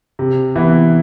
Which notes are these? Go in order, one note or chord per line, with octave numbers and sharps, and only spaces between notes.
C3
E3 B3 E4